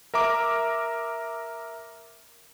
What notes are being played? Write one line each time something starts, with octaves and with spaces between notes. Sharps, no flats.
A#4 E5 A#5 D6